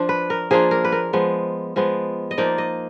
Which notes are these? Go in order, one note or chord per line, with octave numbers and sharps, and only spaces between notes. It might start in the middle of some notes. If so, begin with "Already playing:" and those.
Already playing: F3 D4 F4
B4
A#4
F3 A#3 D4 F4 G#4
A#4
B4
A#4
F3 G#3 B3
F3 G#3 B3
D#5
F3 A#3 D#4 D5
D#5